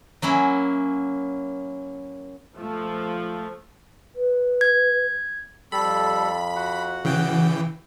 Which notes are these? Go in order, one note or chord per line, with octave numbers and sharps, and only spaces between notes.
F#3 A#3 C#4 E4
F3 A3
B4
G#6
F2 G3 A4 B5
F#4 F#5
C#3 E3 G5